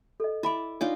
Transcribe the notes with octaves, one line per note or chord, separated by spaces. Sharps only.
A4 D#5
E4 D5 E5 B5
D4 D#4 F4 C#5 D5 D6